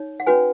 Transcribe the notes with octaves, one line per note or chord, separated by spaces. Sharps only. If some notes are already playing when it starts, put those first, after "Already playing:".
Already playing: D#4 C#5
F#5
C#4 F#4 B4 G#5